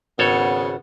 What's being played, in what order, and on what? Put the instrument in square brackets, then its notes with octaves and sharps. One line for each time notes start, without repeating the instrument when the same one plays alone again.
[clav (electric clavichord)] G#1 A4 C#5 [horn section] C#3 B3